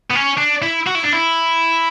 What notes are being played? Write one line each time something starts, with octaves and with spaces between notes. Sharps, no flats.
B3
C#4
D4
E4
F#4
E4
D4
E4